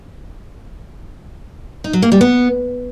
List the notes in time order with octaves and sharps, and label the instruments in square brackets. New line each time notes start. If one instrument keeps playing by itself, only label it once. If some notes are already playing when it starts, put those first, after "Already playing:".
[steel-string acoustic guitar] D#4
F#3
A#3
G3
B3